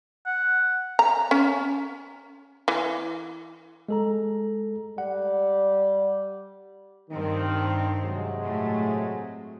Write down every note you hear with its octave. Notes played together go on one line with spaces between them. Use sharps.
F#5
A#5
C#4
E3
G#3 A4 A#5
G3 F#5
G2 D#3 C4
C3 F#3 G#3
A2 A3